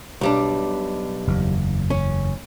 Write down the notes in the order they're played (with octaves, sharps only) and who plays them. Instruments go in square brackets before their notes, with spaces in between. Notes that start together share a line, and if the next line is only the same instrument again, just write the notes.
[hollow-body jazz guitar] B1 G3 D4
[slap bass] F#1 E2
[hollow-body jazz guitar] C#4